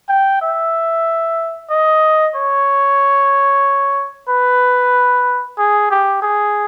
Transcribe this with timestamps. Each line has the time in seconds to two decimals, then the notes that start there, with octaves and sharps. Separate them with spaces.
0.09 G5
0.41 E5
1.70 D#5
2.35 C#5
4.29 B4
5.58 G#4
5.91 G4
6.22 G#4